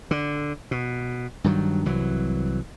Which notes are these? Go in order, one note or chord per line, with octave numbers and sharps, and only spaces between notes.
D3
B2
G2 D#3 F#3
C2 E3 F#3